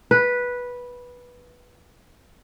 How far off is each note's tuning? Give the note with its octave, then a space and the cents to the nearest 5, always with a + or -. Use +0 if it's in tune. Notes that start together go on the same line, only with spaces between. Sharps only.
B4 -10